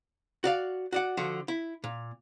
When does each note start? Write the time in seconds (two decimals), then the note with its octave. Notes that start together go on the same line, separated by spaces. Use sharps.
0.44 F#4 D5 F5
0.93 F#4 D5 F#5
1.17 D3 F3 F#4
1.48 E4
1.84 A#2